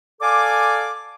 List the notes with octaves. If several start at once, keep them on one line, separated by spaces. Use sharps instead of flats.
A4 D5 F5 G#5 D6